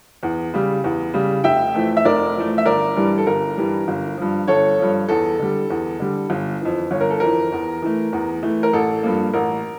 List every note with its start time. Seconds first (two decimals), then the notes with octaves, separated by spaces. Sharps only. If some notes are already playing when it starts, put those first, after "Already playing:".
0.23 E2
0.54 C#3 G3
0.84 E2
1.14 C#3 G3
1.44 F1 E5 G5
1.74 F2 E3 A3
1.97 E5
2.05 F1 A#4 D5
2.36 F2 E3 A3
2.58 E5
2.66 G1 A#4 D5
2.96 G2 E3 G3
3.18 A4
3.27 G1 A#4
3.57 G2 E3 G3
3.88 G1
4.18 G2 F3
4.48 G1 A4 C#5
4.78 G2 F3
5.09 E2 A4
5.39 D3 G3
5.70 E2
6.00 D3 G3
6.30 G1
6.61 F2 E3
6.91 G1 C#5
7.01 A#4
7.10 A4
7.20 F2 E3 A#4
7.52 E2
7.82 E3 A3
8.13 E2
8.43 E3 A3
8.63 A#4
8.73 A1 A4
9.03 G2 F3 A#3
9.33 A1 A#4